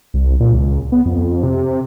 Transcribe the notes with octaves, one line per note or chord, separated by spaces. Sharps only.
C2
A#2
C#2
B3
F2
C3